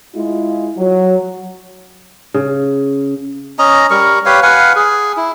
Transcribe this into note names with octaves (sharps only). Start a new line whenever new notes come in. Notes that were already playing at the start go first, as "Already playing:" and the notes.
G#3 E4 F4
F#3
C#3
C#4 D#5 A#5
G3 A#4 C#6
G4 B4 C#5 F5
B4 F5 F#5 G#5
G#4
E4